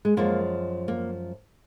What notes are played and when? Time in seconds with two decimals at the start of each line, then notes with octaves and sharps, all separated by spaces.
0.05 G#3
0.17 F#2 F3 G#3 A#3
0.88 A#3